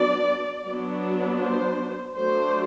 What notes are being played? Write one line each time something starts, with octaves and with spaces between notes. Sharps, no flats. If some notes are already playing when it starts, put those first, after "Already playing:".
Already playing: F#3 B3 D4 D5
F#3 B3 D4
C5
F#3 A3 D4 C5